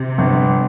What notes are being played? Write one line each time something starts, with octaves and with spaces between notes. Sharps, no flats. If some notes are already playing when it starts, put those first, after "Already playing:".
Already playing: C3
G1